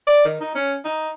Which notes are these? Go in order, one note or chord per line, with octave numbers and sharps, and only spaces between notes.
D5
D#3
D#4
C#4
D#4